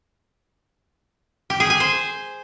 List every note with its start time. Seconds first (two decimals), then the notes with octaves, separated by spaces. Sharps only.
1.50 G4
1.60 G#4
1.70 G#5
1.80 C5